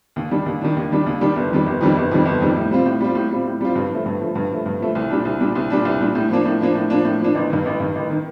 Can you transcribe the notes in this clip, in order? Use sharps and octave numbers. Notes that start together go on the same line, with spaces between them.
D#2
D#3 G3 D4
D#2
D#3 G3 D4
D#2
D#3 G3 D4
D#2
D#3 G3 D4
G1
F2 D#3 G3
G1
F2 D#3 G3
G1
F2 D#3 G3
G1
F2 D#3 G3
A2
G3 C4 F4
A2
G3 C4 F4
A2
G3 C4 F4
A2
G3 C4 F4
G2
F3 A3
G2
F3 A3
G2
F3 A3
G2
F3 A3
C2
A#2 G3 D4
C2
A#2 G3 D4
C2
A#2 G3 D4
C2
A#2 G3 D4
A2
F3 A#3 D4
A2
F3 A#3 D4
A2
F3 A#3 D4
A2
F3 A#3 D4
A1
G2 D#3
A1
G2 D#3
A1
D#3